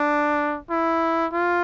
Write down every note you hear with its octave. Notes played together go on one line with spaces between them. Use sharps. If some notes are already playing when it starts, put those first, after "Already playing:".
Already playing: D4
E4
F4